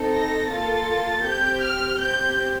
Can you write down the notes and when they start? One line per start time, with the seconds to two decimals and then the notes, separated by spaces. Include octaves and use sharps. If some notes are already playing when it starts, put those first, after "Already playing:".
Already playing: C4 D#4 A4
0.13 A#6
0.50 A#3 F4 A4 A6
1.25 C4 G4 G6
1.62 F6
1.99 C4 G4 G6